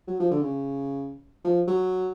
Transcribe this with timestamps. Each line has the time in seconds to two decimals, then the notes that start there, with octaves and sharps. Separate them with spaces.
0.08 F#3
0.20 F3
0.31 D3
0.42 C#3
1.44 F3
1.67 F#3